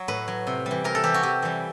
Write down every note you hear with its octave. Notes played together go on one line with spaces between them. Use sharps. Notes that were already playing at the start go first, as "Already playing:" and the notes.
Already playing: F#3
A2 B4
F#3
C3
E3 G3
C3 A#4
A4
E3 G3 G4
F#4
C3 G4
E3 G3